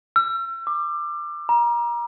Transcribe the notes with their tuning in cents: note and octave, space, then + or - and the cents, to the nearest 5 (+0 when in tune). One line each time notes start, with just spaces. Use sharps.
E6 +40
D6 +20
A#5 +30